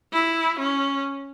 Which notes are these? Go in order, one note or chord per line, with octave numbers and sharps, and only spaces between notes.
E4
C#4